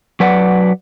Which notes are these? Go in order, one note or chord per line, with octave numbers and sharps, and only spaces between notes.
F#3 B4 D5 F#5